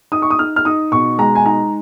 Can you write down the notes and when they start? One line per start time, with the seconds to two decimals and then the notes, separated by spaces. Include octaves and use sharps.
0.12 D#4 D#6
0.22 C#6
0.30 D#6
0.39 D#4 F6
0.56 F6
0.65 D#4 D#6
0.92 B2 C#6
1.18 G#3 A#5
1.35 G#5
1.46 D#4 A#5